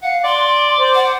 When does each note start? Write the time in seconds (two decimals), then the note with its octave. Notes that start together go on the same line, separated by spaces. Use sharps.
0.03 F5 F#5
0.24 D5 C6
0.80 C5
0.95 F#5